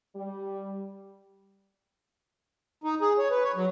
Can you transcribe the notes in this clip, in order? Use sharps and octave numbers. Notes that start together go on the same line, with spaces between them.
G3
D#4
G#4
C#5
B4
C#5
F#3